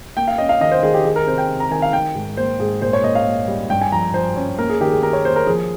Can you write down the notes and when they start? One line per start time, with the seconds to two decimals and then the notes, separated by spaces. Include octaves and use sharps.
0.16 A#3 G5
0.28 F5
0.38 C#4 D#5
0.49 F5
0.61 D#3 D#5
0.72 C5
0.83 D#3 G#4
0.94 G4
1.05 D#3 G#4
1.16 A#4
1.27 C3 C5
1.38 G5
1.49 C3
1.60 A#5
1.71 D#3 G#5
1.82 F5
1.93 D#3 G5
2.15 G#2
2.37 A#3 C5
2.60 G#2 G#4
2.82 A#2 C5
2.93 C#5
3.04 A#2 D#5
3.15 F5
3.26 A#3
3.48 G3
3.70 G2 G5
3.82 G#5
3.92 F3 A#5
4.14 F3 C5
4.36 C#4
4.58 A#3 A#4
4.69 G#4
4.81 D#3 G4
4.92 G#4
5.02 D#3 A#4
5.13 C#5
5.24 A#3 C5
5.36 A#4
5.47 F3 G#4